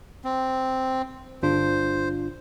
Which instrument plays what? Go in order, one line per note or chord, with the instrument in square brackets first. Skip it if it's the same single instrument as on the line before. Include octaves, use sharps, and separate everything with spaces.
[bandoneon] C4
[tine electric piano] G1 D4 F4 [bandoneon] C5